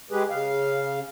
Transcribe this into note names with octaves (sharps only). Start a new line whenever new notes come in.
G#3 G4 G#4 B4
C#3 F5